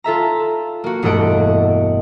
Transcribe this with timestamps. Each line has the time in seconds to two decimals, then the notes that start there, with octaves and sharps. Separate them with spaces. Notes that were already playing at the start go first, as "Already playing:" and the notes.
0.04 F4 A4 E5 A#5
0.84 A#3 F#4
1.03 E1 G2 A3 D#5 F#5 D7